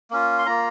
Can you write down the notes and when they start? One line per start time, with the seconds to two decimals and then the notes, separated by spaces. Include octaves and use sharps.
0.11 A#3 C#4 F4
0.39 C6
0.46 A#3 F4 A#5